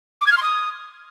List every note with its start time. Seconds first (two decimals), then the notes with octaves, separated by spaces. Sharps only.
0.21 D6
0.26 G#6
0.31 F6
0.37 C6
0.42 D#6